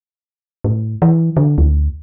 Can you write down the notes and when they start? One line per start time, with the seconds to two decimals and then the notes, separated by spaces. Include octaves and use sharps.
0.64 A2
1.02 E3
1.37 D3
1.58 D2